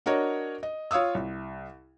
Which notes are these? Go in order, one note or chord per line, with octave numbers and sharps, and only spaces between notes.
D4 F#4 A#4 C#5 D#5
D#5
F4 C#5 F5 D#6 E6
C2